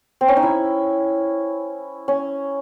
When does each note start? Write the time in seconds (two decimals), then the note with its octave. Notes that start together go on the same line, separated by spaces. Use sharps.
0.21 C4
0.28 C#4
0.37 D#4
0.43 E4
2.08 C#4